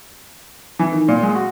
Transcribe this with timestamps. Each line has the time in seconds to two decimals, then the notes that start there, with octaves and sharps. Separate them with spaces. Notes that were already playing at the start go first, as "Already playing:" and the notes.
0.79 E3
0.92 D#3
1.08 A#2
1.23 G#3
1.35 F#4